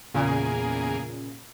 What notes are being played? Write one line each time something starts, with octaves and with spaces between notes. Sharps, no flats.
E2 A#2 C#3 A#3 G#4